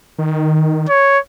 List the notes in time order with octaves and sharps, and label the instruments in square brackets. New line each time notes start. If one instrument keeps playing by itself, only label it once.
[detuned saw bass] D#3
[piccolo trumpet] C#5